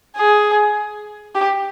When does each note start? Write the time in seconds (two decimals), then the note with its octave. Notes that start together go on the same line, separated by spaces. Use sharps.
0.17 G#4
1.35 G4